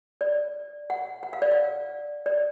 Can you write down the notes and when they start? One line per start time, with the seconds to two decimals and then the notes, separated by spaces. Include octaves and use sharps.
0.21 D5
0.90 F#5
1.23 F#5
1.33 F5
1.42 D5
1.52 F5
2.26 D5